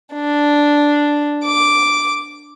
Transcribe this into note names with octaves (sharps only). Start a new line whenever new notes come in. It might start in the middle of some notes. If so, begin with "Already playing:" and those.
D4
D6